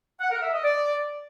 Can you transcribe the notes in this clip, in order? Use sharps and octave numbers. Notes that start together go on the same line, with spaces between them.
F#5
A#4
E5
D#5
D5